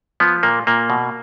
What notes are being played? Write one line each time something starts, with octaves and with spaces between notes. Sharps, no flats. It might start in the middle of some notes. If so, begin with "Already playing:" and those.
F3 B3
A#2 A#3
A#2 A#3
B2